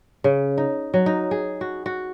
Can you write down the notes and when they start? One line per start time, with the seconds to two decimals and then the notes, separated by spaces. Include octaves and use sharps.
0.24 C#3
0.58 D#4
0.94 F#3
1.06 D#4
1.31 G#4
1.61 F#4
1.86 F#4